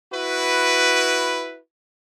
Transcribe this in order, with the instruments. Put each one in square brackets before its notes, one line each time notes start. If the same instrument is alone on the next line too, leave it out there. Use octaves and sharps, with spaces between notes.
[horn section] E4 F#4 B4